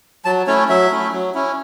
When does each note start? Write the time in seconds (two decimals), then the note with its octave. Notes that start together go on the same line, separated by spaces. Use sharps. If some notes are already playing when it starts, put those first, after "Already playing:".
0.25 F#3 A5
0.47 A3 C#4 E4 C#5
0.69 F#3 E5
0.91 A3 C#4 E4
1.12 F#3
1.35 C#4 E4